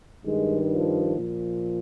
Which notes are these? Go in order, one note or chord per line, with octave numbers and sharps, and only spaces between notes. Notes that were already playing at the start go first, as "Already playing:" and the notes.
G2 D#3 G#3
F3
A#2 F3